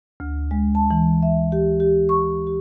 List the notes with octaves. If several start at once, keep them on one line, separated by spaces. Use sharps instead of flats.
D2
G#3
A5
E3
E5
G4
G4
C#6
G4